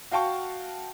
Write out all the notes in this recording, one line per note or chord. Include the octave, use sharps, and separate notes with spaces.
F#4 F5 G5 A5 C#6